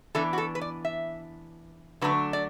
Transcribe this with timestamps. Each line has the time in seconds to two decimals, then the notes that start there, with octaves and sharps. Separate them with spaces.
0.15 E3 B3 D4 A4
0.33 F#4
0.38 A4
0.55 B4
0.61 D5
0.85 E5
2.01 D3 F#3 A3 D4 B4
2.33 D5